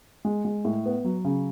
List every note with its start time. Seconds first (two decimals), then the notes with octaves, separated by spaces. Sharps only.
0.25 G#3
0.45 G#3
0.65 A2
0.86 B3
1.05 F#3
1.25 C#3